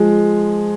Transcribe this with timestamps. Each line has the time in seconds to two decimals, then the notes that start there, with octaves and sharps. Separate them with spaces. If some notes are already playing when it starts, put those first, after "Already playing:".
Already playing: F3 G#3